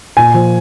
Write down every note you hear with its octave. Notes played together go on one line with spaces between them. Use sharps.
A#2 G#5
F3